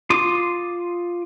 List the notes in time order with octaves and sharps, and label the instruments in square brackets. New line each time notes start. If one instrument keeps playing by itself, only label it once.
[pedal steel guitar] F4 C6 D6 D#6